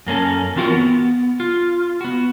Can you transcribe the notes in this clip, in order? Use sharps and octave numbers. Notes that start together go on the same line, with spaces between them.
F#2 A#3 C#4 A4
E3 C4 F4 F#4 A#4
B3
F4
B3 F#4